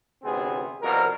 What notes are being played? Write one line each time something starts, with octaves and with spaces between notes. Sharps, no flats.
A1 D2 C3 B3 C4 G#4
C2 F2 B2 A#4